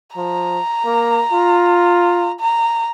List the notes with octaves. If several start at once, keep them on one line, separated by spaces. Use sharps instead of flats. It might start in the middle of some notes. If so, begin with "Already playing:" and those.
F3 A#5
A#3
F4
A#5